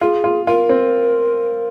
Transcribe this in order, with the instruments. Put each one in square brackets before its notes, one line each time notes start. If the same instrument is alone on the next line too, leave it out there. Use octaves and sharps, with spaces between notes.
[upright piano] F4 [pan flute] G#4
[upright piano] F4
[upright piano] F4 [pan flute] A#4
[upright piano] C4